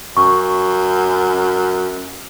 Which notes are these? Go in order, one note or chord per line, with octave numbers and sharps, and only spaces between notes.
F#2 C#6